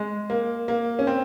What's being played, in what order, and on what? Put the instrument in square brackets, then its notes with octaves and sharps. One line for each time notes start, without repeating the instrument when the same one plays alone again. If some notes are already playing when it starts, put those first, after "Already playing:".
Already playing: [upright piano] G#3
A#3
A#3
C#4
C4